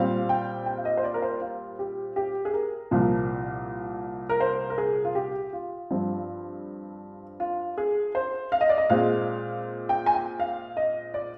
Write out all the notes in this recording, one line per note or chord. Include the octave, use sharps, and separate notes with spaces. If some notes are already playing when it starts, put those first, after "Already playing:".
Already playing: A#2 G3 C4 F5
G5
G5
F5
D#5
C5
D5
A#4
C5
F4
G4
G4
G#4
A#4
C2 A#2 F3 A#3
A#4
C5
A#4
G#4
F4
G4
F4
G2 F3 C4
F4
G#4
C5
F5
D#5
D5
D#5
A#2 G#3 C4 F5
G5
G#5
G5
F5
D#5
D5